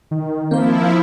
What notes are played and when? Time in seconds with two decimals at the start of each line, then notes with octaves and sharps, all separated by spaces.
0.11 D#3
0.51 F3 A#3 C4 E4 C5